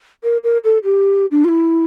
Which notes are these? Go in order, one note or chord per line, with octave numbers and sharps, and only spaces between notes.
A#4
A#4
A4
G4
D4
F4
E4